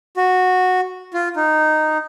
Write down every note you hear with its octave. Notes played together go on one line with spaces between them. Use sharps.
F#4
F4
D#4